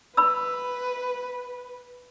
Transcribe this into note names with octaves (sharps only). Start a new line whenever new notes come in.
B4 B5 E6